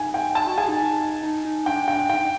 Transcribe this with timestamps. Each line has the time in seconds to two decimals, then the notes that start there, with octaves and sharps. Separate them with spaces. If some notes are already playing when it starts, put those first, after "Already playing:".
Already playing: D#4 G#5
0.14 G5
0.35 D#4 A5
0.47 F#4
0.57 G#4 G#5
0.68 D#4
1.23 D#4
1.45 D#4
1.66 D4 G5
1.87 D4 G5
2.10 D#4 G5